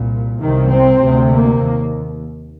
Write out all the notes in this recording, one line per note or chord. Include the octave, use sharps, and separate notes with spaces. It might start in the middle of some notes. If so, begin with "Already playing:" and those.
Already playing: C2 A#2
C2 C3 D#3
C4
D2 C3
A#3
D#2